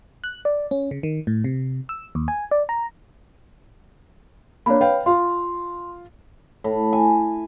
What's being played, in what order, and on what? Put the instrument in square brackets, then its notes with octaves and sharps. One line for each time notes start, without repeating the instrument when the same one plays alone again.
[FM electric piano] F#6
D5
C#4
C#3
D#3
A2
C3
E6
D#2
G#5
D5
A#5
[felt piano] A#3 D4 [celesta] C#5 B5
[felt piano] B4 F5 G5
[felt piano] F4 F5 [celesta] C6
[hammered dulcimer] A2
G#5